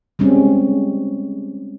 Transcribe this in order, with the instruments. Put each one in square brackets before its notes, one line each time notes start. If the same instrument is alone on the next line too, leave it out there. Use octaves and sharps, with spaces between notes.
[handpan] G3 G#3 C4 C#4